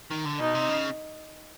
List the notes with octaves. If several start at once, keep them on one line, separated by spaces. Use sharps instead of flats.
D#3
D3
B2 D#4
C3
C#3